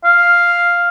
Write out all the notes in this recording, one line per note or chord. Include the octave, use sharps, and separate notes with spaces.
F5